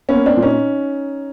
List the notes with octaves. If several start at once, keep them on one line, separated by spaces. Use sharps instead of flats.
B3 C#4
A#3
C4 D4
A#2
C#4 D#4